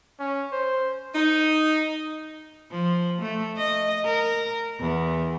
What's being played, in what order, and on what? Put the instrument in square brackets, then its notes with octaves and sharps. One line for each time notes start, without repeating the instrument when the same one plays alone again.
[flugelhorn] C#4
C5
[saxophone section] D#4
[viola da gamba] F3
A3
D#5
A#4
E2